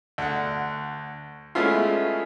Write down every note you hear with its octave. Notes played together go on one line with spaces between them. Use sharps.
D2 F#5
G#3 A3 B3 C#4 E4 F4